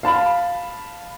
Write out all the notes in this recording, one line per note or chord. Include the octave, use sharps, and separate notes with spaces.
F5 A5 B5